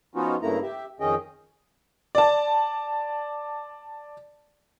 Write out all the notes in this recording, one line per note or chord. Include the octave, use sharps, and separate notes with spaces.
F3 B3 C#4 D#4 F4 F#4
G2 C#3 A3 A#3 E4 A#5
G4 E5
F2 D#3 C#4 G#4 D#5 G5
D5 A5